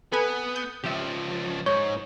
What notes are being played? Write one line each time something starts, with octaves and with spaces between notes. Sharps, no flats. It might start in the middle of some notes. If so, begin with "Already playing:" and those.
B3 A4 B4 G#5
G6
C#2 F3 G4 E5
G#2 C#5 G6